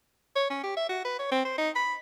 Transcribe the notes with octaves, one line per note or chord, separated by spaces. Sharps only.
C#5
C#4
G4
E5
F#4
B4
C#5
C4
C5
D#4
B5